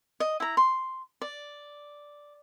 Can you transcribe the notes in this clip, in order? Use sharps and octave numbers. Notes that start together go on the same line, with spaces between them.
D#5
E4 A#5
C6
D5